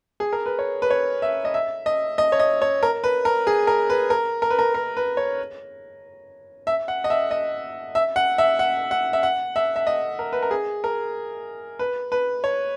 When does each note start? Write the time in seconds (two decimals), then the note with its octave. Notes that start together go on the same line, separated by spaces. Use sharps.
0.20 G#4
0.33 A#4
0.46 B4
0.59 C#5
0.82 B4
0.90 C#5
1.22 E5
1.45 D#5
1.54 E5
1.86 D#5
2.18 D#5
2.32 C#5
2.39 D#5
2.62 C#5
2.83 A#4
3.04 B4
3.25 A#4
3.47 G#4
3.67 A#4
3.90 B4
4.10 A#4
4.42 A#4
4.50 B4
4.59 A#4
4.74 A#4
4.97 B4
5.17 C#5
6.67 E5
6.88 F#5
7.04 D#5
7.10 E5
7.31 D#5
7.95 E5
8.16 F#5
8.38 E5
8.59 F#5
8.91 F#5
9.13 E5
9.23 F#5
9.56 E5
9.76 E5
9.87 D#5
10.19 A#4
10.33 B4
10.42 A#4
10.51 G#4
10.84 A#4
11.79 B4
12.12 B4
12.44 C#5